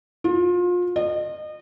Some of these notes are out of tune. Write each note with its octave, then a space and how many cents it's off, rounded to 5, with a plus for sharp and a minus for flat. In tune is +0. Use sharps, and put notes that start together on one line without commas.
F4 +30
D#5 -30